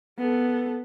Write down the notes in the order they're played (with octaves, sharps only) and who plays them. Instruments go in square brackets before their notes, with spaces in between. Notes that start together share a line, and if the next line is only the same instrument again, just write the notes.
[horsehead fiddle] B3 A4